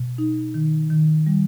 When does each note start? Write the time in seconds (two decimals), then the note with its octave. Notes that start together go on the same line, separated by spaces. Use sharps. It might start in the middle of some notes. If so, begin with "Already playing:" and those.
Already playing: B2
0.18 D#4
0.54 D#3
0.90 D#3
1.27 G3